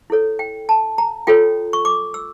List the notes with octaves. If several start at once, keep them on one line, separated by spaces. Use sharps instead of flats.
E4 A4 C#5
G5
A5
A#5
F4 A4 C#5 G5
C#6
D6
E6